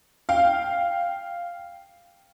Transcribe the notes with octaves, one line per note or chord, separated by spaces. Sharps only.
F5 G5